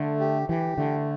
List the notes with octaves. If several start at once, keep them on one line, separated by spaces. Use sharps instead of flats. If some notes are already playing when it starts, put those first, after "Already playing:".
Already playing: D3 A3
G4
E3 G4
D3 A3